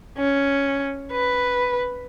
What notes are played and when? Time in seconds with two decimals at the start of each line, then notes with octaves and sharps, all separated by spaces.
0.18 C#4
1.12 B4